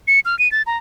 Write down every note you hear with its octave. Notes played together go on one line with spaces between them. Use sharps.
C#7
F6
D#7
A6
A#5